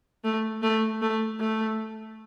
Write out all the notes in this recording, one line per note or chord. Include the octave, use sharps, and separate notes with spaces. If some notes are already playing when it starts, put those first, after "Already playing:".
A3
A3
A3
A3